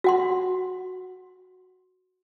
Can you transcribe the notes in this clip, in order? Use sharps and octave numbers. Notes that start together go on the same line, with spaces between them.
F#4 F#5 C6